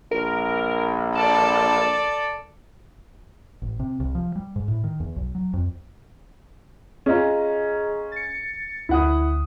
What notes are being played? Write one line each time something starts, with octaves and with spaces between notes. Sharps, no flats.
A#1 A#4
A4 D5 A5
A1
C3
C2
F3
G3
G#2
A2
D#3
E2
B1
F#3
F2
C#4 F4 G#4 D#5 A#5
A6 C#7
D2 E4 F#5 D#6